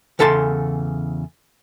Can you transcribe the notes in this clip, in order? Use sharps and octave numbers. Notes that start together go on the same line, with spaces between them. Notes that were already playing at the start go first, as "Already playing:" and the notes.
E2 C#3 A4 A5 A#5 C6